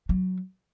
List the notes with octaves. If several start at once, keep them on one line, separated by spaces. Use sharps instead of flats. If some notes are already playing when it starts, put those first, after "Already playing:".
F#3